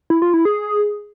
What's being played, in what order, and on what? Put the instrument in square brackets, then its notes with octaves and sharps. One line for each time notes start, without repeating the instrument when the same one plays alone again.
[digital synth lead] E4
F4
E4
G#4